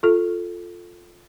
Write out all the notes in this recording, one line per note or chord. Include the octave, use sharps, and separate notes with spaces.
F4 A4